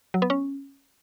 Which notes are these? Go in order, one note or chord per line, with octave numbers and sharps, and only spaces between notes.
F#3
B3
C#4